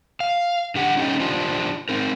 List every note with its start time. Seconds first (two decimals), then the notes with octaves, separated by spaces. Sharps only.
0.20 F5
0.75 D3 G4 F#5
0.97 C#4 D#4 G4 A4 D#5 G5
1.20 D4 F4 G4 C5
1.89 C4 D#4 A#4